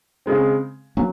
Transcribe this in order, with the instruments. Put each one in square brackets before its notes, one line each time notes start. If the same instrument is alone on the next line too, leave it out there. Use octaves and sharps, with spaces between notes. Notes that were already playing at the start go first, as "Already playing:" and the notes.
[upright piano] C#3 G#3 C4
[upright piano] F#3 [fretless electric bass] A#3 C#4